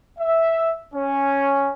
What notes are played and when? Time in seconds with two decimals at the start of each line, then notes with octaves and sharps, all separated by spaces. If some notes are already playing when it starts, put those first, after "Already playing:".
0.19 E5
0.94 C#4